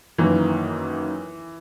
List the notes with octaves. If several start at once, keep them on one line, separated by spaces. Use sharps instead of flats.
F#2 D#3 E3 A#3